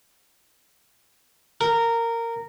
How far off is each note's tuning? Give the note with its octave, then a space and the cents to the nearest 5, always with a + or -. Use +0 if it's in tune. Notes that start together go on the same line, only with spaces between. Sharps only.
A#4 -15